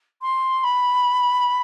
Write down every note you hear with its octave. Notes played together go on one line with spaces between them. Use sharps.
C6
B5